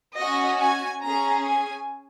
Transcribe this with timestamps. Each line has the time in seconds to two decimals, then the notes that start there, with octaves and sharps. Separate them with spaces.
0.17 C#4 F#4 D#5
0.59 G#5
1.02 C#4 G#4 A#5
1.44 G#5